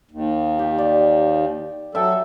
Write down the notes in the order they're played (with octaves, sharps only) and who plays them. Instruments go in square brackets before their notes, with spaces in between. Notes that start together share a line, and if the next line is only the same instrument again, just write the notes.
[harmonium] D#2
[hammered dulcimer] G4
D5
[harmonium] F#3 A4 [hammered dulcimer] E5 G5